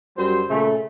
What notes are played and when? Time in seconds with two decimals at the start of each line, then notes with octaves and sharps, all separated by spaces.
0.17 F#2 G3 C5
0.49 A#2 C#3 A3